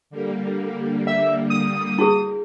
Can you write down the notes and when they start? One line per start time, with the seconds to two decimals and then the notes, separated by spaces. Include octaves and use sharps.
0.10 D3 G3 A#3
1.07 E5
1.50 D#6
1.99 E4 F#4 G#4